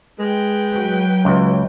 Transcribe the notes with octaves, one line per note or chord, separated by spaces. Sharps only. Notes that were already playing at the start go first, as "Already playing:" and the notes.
G#3 B4 G5
F#3
C#2 E3